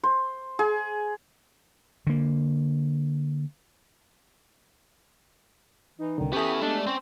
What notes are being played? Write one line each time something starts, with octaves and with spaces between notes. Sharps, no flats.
C5
G#4
D3 A#3
E3 D#4
C2 D3 D#3
B3 C#4 E4 G4 A4 G5 D#6 B6
G#3 A3 B3 D4 D5
C4 C#4 C5